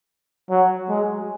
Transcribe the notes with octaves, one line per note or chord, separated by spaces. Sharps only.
F#3
G#3